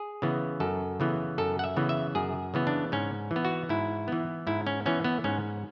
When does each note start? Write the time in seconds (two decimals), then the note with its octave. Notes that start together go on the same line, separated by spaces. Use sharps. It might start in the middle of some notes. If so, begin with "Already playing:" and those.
Already playing: G#4
0.22 C#3 E3 B3
0.60 F#2 A4
1.00 C#3 E3 B3
1.38 F#2 A4
1.59 F#5
1.64 E5
1.76 C#3 E3 B3
1.89 E5
2.15 F#2 G#4
2.54 C#3 E3 B3
2.67 D4
2.92 G#2 C#4
3.31 E3
3.36 B3
3.45 F#4
3.69 G#2 E4
4.08 E3 B3
4.47 G#2 E4
4.67 C#4
4.86 E3 B3 C#4
5.04 B3
5.24 G#2 C#4